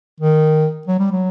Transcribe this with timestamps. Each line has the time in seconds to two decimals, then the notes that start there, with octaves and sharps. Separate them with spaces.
0.20 D#3
0.87 F#3
0.99 G3
1.12 F#3